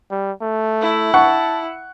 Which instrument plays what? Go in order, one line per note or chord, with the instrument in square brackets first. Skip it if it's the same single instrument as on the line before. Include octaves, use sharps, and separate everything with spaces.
[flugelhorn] G3
A3
[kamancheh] E4
[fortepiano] F#5 C#6 [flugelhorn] A5